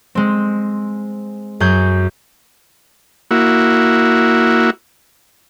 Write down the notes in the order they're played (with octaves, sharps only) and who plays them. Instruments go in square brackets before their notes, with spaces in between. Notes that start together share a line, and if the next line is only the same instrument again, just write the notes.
[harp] G#3 C4
F#2 G#4 G6
[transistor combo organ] A#3 E4 F#4